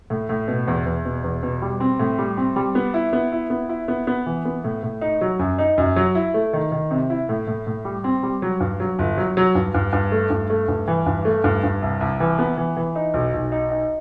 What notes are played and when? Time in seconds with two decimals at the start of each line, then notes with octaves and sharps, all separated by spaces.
0.10 A2
0.29 A2
0.48 B2
0.67 E2
0.86 E2
1.05 B2
1.24 E2
1.43 B2
1.62 G3
1.80 C4
1.99 A2
2.18 G3
2.37 C4
2.56 G3
2.75 B3
2.94 E4
3.13 B3
3.32 E4
3.50 B3
3.69 E4
3.88 B3
4.07 B3
4.26 E3
4.45 B3
4.64 A2
4.83 A2
5.01 D#4
5.21 F#3
5.39 F#2
5.59 D#4
5.78 F#2
5.96 F#3
6.15 E4
6.34 A3
6.53 D#3
6.72 D#3
6.91 C3
7.10 E4
7.29 A2
7.47 A2
7.67 A2
7.85 G3
8.04 C4
8.23 G3
8.42 F#3
8.60 G2
8.80 F#3
8.99 G1
9.17 F#3
9.37 F#3
9.55 G2
9.74 G2
9.93 G2
10.12 A3
10.30 G2
10.50 A3
10.68 G2
10.88 E3
11.06 G2
11.25 A3
11.44 G2
11.63 G2
11.82 C2
12.00 C2
12.20 E3
12.39 B3
12.57 E3
12.77 E3
12.95 D#4
13.14 B1
13.33 B1
13.52 D#4
13.71 D#4